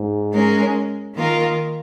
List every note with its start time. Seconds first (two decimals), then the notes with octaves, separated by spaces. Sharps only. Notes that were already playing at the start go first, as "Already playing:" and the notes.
Already playing: G#2
0.33 G#3 C#4 A#4
1.15 D#3 A#3 F4 A#4